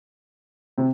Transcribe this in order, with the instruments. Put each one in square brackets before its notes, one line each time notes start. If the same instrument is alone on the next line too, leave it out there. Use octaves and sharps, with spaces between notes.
[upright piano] C3 C4